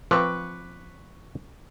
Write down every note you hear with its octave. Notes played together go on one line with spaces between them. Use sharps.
F3 C4 B4 C#6 D6